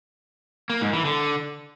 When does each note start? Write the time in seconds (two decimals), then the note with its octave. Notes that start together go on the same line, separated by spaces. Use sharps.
0.70 A#3
0.81 G#2
0.93 E3
1.05 D3